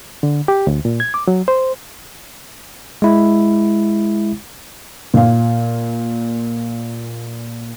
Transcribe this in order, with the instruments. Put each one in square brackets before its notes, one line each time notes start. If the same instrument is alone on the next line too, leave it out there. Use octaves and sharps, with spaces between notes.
[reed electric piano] D3
G4
D2
A#2
G#6
D6
F#3
C5
[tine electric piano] G#3 E4
[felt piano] A#2 F5